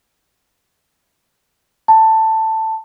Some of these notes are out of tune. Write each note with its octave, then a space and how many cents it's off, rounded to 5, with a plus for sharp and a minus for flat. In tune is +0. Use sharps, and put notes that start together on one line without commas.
A5 +10